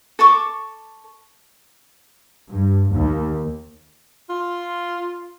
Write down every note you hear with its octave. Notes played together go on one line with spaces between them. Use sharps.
A4 A5 C#6 D6
G2
D#2
F4